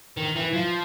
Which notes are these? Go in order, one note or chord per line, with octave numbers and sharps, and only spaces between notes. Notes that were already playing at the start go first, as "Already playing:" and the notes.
D#3
E3
F3